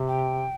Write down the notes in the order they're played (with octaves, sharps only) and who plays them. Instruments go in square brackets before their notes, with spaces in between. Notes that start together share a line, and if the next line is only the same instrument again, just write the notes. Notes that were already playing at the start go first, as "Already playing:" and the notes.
Already playing: [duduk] C3
[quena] G5